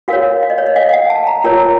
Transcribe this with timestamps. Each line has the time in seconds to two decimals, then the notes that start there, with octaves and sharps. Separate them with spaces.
0.08 F#4 A#4 C#5 F5
0.43 F5
0.50 D#5
0.58 C#5
0.67 D#5
0.76 F5
0.89 F5
0.93 F#5
1.10 A5
1.27 A#5
1.44 F4 A#4 C#5 A#5